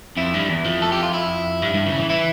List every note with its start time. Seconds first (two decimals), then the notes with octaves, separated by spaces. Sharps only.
0.17 F2 E4
0.34 G2
0.49 E2
0.65 F2
0.82 A4
0.92 G4
1.03 F4
1.14 E4
1.62 G2
1.74 G2
1.86 C#3
1.97 E3
2.10 E3 E4